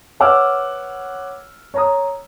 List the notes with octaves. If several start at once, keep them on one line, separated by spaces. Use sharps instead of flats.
B4 C#5 F#5 D6 E6 F6
C#5 A#5 D#6